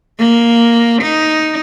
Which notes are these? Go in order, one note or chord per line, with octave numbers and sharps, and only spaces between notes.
A#3
D#4